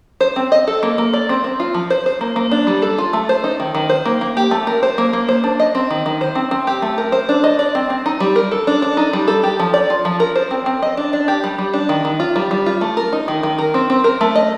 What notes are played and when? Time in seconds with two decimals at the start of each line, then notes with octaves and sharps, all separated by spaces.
0.21 C5
0.36 C4
0.52 D#5
0.67 A4
0.83 A#3
0.98 A#3
1.13 D5
1.29 C4
1.44 C4
1.60 F4
1.74 F3
1.90 C5
2.06 C5
2.21 A#3
2.36 A#3
2.51 D4
2.67 G3
2.82 A4
2.98 F4
3.13 A3
3.29 C5
3.44 D#4
3.60 D#3
3.75 D#3
3.89 C5
4.06 A#3
4.21 A#3
4.37 G4
4.51 A3
4.67 A#4
4.83 C5
4.98 A#3
5.13 A#3
5.29 C5
5.44 D4
5.60 D#5
5.75 C4
5.90 D#3
6.06 D#3
6.21 C5
6.35 C4
6.51 C4
6.67 G4
6.82 A3
6.98 A#4
7.12 C5
7.29 D4
7.44 D#5
7.59 D5
7.75 C4
7.90 C4
8.06 D#4
8.20 G3
8.36 A#4
8.51 A4
8.67 D4
8.82 D4
8.97 D#4
9.13 G3
9.28 A4
9.43 G4
9.59 F3
9.74 D5
9.90 F4
10.05 F3
10.20 A#4
10.36 C5
10.51 C4
10.66 C4
10.82 D#5
10.97 D4
11.13 D4
11.28 G4
11.44 G3
11.58 G3
11.74 D4
11.89 D#3
12.05 D#3
12.20 F4
12.36 G3
12.51 G3
12.66 F4
12.81 A3
12.97 A#4
13.13 D#4
13.28 D#3
13.43 D#3
13.58 A#4
13.74 C4
13.90 C4
14.04 A#4
14.21 A3
14.36 D#5